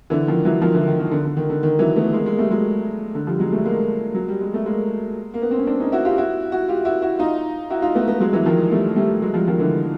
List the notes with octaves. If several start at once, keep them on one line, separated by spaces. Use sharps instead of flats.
D3 E3
D#3 F3
E3 F#3
D#3 F3
D3 E3
D#3
D#3
D3
D3
D#3
D3
D#3
E3 F#3
A3 B3
G#3 A#3
G#3 A#3
G3 A3
F#3 G#3
D3
F3 G3
F#3 G#3
G3 A3
G#3 A#3
F#3
G3
G#3
A3
G#3 A#3
A#3
B3
C4
C#4
C4 D4
C#4 D#4
E4 F#4
F4 G4
E4 F#4
E4 F#4
F4 G4
E4 F#4
E4 F#4
D#4 F4
E4 F#4
D#4 F4
A3 B3
A3 B3
F#3 G#3
E3 F#3
D#3 F3
G3 A3
G3 A3
F#3 G#3
F3 G3
D#3 F3
D3 E3